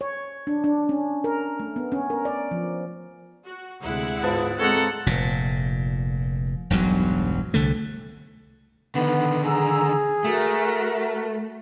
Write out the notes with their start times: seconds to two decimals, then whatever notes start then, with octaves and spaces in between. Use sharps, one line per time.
0.01 C#5
0.47 D4
0.64 D4
0.89 C#4
1.24 A#4
1.60 A3
1.76 B3
1.92 C#4
2.10 A#4
2.25 D5
2.51 F3
3.47 F#4
3.82 D2 C3 G#3 E4 F#5
4.23 G#2 F3 B3
4.60 G#3 C4 A4 C#5 F#5 A#5
5.06 F1 A#2
6.70 E1 B1 G2 F#3
7.54 C2 D3 A3
8.95 D3 D#3 B3
9.44 G#4 A#5 E6
10.24 A3 F#4 A#4 E5